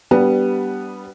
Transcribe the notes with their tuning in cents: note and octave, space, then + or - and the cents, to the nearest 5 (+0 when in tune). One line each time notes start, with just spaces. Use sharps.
G3 -10 B3 -5 D4 -20